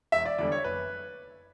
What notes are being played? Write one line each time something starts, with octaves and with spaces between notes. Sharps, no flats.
E1 E5
D5
E2 D3 G3 D5
C#5
F#1 B4